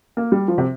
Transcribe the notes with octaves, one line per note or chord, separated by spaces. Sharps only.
A#3
G3
F3
C3